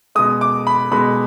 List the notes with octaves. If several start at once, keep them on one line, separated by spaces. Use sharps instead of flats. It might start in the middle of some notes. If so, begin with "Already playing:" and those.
B2 G#3 D#6
D6
B5
B2 G#3 B5